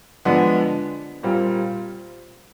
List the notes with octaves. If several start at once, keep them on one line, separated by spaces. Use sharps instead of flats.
D3 F3 G#3 B3 D4
A#2 G3 C4 F4